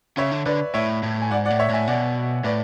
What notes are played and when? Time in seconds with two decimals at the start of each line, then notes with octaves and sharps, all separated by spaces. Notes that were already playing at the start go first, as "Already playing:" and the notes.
0.17 C#3 C#5 E5
0.32 D3
0.46 D3 B4 D5
0.74 A2 C#5 E5
1.03 A2
1.22 G#5
1.30 G#2 D5 F#5
1.45 D5 F#5
1.50 A2
1.59 C#5 E5
1.69 A2 E5 G#5
1.87 B2 D5 F#5
2.44 A2 B4 D5